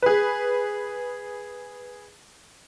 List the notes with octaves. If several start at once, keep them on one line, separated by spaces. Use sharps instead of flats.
G#4 B4